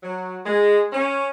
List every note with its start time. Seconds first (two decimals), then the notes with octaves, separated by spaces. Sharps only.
0.02 F#3
0.46 G#3
0.92 C#4